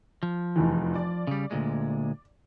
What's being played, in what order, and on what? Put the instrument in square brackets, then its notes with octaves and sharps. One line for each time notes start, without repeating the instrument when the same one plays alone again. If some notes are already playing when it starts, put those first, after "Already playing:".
[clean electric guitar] F3
[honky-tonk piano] F1 E2 E3
D5
[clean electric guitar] C#3 G3
D2 A#2 G#3